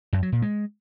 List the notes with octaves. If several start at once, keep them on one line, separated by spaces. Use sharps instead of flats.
F#2
F#3
A#2
G#3